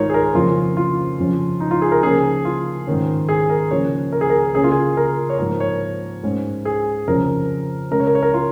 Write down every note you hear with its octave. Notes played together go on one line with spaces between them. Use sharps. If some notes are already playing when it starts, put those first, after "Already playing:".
Already playing: G#2 D#3 G#3 D#4 F4 A#4 C#5
G#4
A#4
F2 C#3 A#3 C#4 F4
F4
F2 C#3 F3 C#4
D#4
F4
G#4
A#4
C#3 F3 A#3 C#4 G#4
F4
G#2 D#3 C#4
G#4
A#4
C#3 F3 A#3 C#4 C#5
A#4
G#4
A#4
C#3 A#3 C#4 G#4
F4
G#4
A#4
C#5
G#2 F3 A#3 A#4
C#5
G#2 G#3 C#4
G#4
F2 C#3 F3 C#4 A#4
C#3 G#3 C#4 A#4
C#5
A#4
C#5
A#4
F4